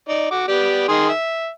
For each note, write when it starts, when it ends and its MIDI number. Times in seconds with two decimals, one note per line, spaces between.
0.09 0.27 63
0.09 0.27 74
0.31 0.47 66
0.31 0.47 86
0.48 0.84 59
0.48 0.84 67
0.48 0.84 74
0.88 1.09 51
0.88 1.09 68
0.88 1.09 84
1.09 1.48 76